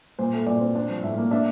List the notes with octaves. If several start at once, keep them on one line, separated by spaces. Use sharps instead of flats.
A#2 C5
A3
A#2 D5
C4
D4 C5
F3
A2 E5
A#3
D4 E5